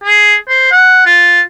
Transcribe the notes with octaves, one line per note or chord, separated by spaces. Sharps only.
G#4
C5
F#5
F4